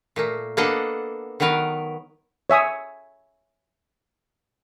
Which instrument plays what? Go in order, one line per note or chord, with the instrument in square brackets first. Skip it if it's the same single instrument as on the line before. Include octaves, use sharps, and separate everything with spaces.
[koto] A#2 A3 A#3
A#3 B3 D4 A4 D#5 F#5
D#3 F#3 B3 A#4 B4
[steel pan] C#5 E5 G#5 D#6